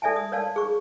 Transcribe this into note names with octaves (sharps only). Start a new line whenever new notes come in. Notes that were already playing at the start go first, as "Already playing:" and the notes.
A4 D5 E5 G#5 A5
D#6
A#4 C#5 D5 F5 A5
G#4 C#6